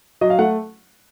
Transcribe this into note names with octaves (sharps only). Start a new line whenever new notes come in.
F#3 D#5
F5
A3 F#5